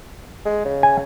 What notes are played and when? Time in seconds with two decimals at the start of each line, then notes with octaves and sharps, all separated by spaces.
0.45 G#3
0.65 C#3
0.83 G#5